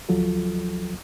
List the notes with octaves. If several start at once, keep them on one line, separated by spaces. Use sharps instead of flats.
D2 F3 F#3 F4 A4